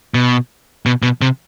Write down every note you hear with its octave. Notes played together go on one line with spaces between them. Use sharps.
B2
B2
B2
C3